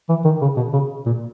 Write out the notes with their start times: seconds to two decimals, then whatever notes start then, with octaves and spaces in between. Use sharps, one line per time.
0.09 E3
0.25 D#3
0.42 C#3
0.57 B2
0.73 C#3
1.06 A#2